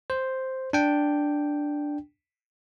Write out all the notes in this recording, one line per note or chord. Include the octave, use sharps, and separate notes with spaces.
C5
D4 G5